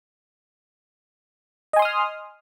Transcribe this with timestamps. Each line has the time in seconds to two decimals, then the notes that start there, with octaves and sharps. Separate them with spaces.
1.73 D#5
1.76 G#5
1.79 C6
1.82 D#6
1.85 F6